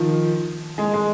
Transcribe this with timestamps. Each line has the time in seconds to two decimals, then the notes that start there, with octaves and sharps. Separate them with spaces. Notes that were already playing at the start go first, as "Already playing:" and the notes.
Already playing: D#3 F3
0.78 G#3
0.94 G#3